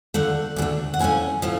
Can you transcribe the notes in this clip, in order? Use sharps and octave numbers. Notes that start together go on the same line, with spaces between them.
D2 D3 F3 A3 F#5
D2 D3 F3
A3
F#5
A2 F3 A3 C#4 G#5
A2 F3 A3 C#4